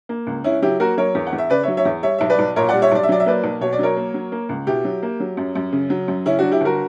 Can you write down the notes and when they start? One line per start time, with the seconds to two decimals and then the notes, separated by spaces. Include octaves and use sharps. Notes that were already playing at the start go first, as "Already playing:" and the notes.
0.09 A#3
0.27 C#2
0.44 C#3 C#4 E4
0.62 F#3 E4 G4
0.80 A#3 F#4 A#4
0.97 F#3 A#4 C#5
1.15 E2
1.27 F#5
1.33 E2
1.38 E5
1.50 C#3 B4 D5
1.63 C#5 E5
1.68 F#3
1.77 C#5 E5
1.85 E2
2.03 G3 C#5 E5
2.19 B1 E5
2.30 B4 D5
2.39 B1
2.56 A#2 A#4 C#5
2.69 G3 D5 F#5
2.82 C#5 E5
2.92 B1 D5
3.03 E5
3.09 F#3 D5
3.20 E5
3.26 A#3 B4 D5
3.44 B1
3.61 B2 C#5
3.73 D5
3.79 F#3 A#4 C#5
3.97 A#3
4.14 F#3
4.32 A#3
4.49 C#2
4.67 B2 E4 G4
4.85 F#3
5.03 A#3
5.20 F#3
5.37 F#2
5.56 F#2
5.73 C#3
5.90 F#3
6.08 F#2
6.26 C#3 C#4 E4
6.39 F#3 D4 F#4
6.52 E4 G4
6.61 G1 F#4 A#4